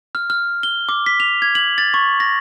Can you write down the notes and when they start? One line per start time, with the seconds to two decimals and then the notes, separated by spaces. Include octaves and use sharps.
0.15 F6
0.30 F6
0.63 G7
0.89 D6
1.06 B6
1.20 F7
1.42 G#6
1.55 F#7
1.78 A6
1.94 C#6
2.20 A#6